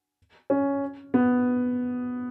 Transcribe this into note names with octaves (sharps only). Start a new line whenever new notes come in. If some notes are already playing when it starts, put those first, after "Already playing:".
C#4
B3